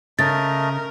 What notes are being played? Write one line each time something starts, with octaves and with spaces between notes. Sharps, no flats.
C#3 A3 A#4 D#5 A6